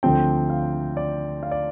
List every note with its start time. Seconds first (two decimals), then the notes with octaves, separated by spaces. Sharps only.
0.03 D2 D3 F3 C4 G5
0.50 F5
0.97 D5
1.43 F5
1.51 D5